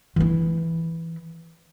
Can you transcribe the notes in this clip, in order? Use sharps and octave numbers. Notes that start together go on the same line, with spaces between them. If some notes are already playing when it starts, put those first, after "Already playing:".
E3 E4